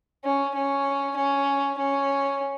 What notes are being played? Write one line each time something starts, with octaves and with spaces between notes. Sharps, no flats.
C#4
C#4
C#4
C#4